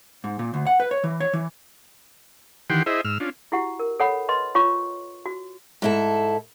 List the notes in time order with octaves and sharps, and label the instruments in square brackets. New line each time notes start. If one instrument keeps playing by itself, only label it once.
[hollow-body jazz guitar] G#2
A#2
D2
F#5
B4
C#5
E3
C#5
E3
[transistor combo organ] D#3 E3 G4 F#5 G5 C6
E4 G#4 C5 D#5 E5
G#2 E6 F6
C#4 D4 F4
[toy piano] E4 F#4 G4 F#5
A#4
A4 C#5 F#5 B5
B4 D#5 C6
F4 C#5 C#6
F#4
[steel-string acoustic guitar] G#2 E4 A4